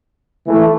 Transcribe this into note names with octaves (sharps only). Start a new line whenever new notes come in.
E3 A3